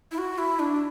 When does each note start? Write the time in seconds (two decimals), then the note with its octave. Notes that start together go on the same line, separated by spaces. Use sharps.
0.11 E4
0.18 F#4
0.38 E4
0.59 D4